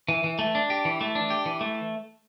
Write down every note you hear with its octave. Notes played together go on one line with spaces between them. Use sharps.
E3
E3
A3
D4
G4
E3
A3
D4
G4
E3
A3